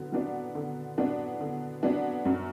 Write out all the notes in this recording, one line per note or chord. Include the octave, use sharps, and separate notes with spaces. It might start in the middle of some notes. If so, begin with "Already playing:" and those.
Already playing: D3 F#3 B3
F#3 B3 D4
D3
F#3 B3 D4
D3
F#3 B3 D4
F#2